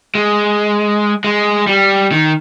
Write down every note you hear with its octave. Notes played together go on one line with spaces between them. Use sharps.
G#3
G#3
G3
D#3